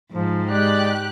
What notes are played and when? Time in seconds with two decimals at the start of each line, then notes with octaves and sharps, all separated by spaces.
0.12 G#2 F3
0.50 G#3 G4 D5 F#6